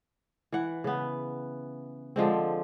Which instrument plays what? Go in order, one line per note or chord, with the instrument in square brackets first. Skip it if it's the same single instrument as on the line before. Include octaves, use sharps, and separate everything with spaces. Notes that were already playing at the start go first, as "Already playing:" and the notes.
[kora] E3 F#5
C#3 B3
D3 F3 G#3 C4